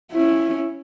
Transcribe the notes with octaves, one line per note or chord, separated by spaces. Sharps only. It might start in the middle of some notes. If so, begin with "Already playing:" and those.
C#4 E4